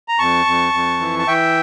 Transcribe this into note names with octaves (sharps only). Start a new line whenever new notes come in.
A#5
F2 A5 C#6
F2
F2
E3
A5
E3 E5 G5